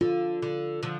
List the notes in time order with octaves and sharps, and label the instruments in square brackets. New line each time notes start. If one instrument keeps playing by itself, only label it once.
[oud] D3 [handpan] F4
[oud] D3
D3 F3